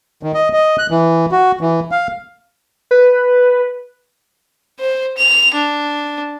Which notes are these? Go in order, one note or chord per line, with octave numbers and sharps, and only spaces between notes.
D#3
D#5
D#5
F#6
E3
F#4
E3
F5
B4
C5
F7
D4